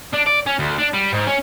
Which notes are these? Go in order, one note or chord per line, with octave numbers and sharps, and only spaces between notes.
D4
D5
C#4
D2
D4
G3
G#2
C#4